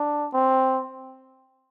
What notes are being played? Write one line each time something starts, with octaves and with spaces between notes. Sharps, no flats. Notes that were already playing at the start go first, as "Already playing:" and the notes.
Already playing: D4
C4